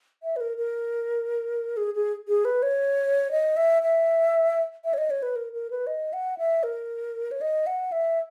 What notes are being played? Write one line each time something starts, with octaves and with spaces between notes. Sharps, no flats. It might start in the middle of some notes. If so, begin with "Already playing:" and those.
E5
B4
A#4
A#4
G#4
G#4
G#4
B4
C#5
D#5
E5
E5
E5
C#5
D#5
C#5
B4
A#4
A#4
B4
D#5
F#5
E5
A#4
C#5
D#5
F#5
E5